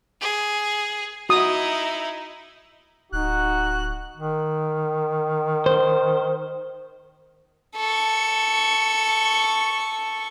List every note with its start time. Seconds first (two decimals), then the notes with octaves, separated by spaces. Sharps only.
0.21 G#4
1.29 D#4 E4 F#4 D#6
3.12 D1 D#4 F#4 F#6
4.16 D#3
5.66 C5
7.76 A4 C#6